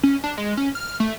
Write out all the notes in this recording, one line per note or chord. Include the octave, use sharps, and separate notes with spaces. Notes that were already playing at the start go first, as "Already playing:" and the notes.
C#4
D4
G#3
C#4
F6
A3